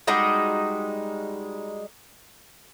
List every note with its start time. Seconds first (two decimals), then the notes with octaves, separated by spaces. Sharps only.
0.07 G3 G#3 D#4 F#4